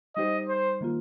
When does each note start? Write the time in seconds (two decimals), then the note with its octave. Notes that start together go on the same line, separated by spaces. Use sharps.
0.16 G3 D#4 G4 C5 D#5
0.48 C5
0.81 D#3 A#3 F4